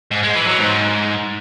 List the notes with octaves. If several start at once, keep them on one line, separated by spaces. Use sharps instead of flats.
G#2
G#3
E3
F#3
G#2